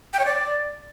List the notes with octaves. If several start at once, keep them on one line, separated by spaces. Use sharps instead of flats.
G5
C#5
D5